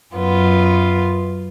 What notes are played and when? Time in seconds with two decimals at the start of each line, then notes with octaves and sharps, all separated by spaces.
0.15 F#2 B3 F4